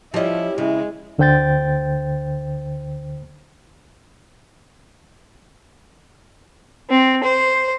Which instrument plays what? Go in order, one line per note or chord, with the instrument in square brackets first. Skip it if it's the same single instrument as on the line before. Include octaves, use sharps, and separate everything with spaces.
[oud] F3 D#5 [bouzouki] G3 C#4 G4 [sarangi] E4
[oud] C#3 [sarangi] G#3 [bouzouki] C4 [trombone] E4
[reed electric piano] D2 D3 C5 G5 G6 A6
[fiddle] C4
C5